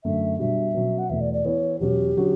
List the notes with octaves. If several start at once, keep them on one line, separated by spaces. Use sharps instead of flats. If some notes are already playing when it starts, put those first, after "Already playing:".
F#2 D3 A3 E5
B2 G3 D4 F#4 E5
B2 F#3 C#4
F#5
E2 B2 A3 E5
D5
D5
E3 B3 E4 C#5
E2 B2 F#3 C#4 G4
D3 F#3 C#4 F#4